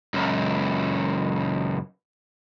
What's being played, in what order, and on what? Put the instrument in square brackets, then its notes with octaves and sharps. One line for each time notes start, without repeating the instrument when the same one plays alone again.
[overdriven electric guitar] C#2 F#2